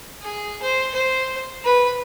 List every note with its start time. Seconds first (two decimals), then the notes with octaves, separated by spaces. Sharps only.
0.22 G#4
0.62 C5
0.94 C5
1.64 B4